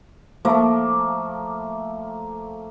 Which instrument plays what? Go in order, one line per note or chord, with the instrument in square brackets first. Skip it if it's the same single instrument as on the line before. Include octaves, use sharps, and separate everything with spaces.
[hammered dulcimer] F3 A3 A#3